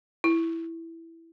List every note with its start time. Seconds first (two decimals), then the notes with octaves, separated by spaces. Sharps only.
0.24 E4